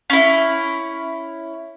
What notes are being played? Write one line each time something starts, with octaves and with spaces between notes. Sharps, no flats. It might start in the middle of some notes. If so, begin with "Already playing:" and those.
C#4 E4